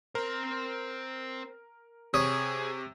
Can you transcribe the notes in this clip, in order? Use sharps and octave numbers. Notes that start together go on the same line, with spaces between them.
C4 A#4 C5
C3 G#4 C#5 D#6